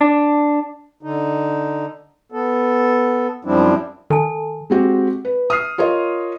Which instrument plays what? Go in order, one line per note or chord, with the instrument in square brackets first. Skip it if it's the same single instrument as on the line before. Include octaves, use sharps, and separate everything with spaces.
[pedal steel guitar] D4
[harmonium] D3 D#4
B3 A4
F#2 F3 G3 C4 D4 E4
[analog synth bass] D#3 [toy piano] A4 G#5 A5
[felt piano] G#3 C4 F#4 G4
B4
D#6 F6 C7
F4 A#4 C#5 D#5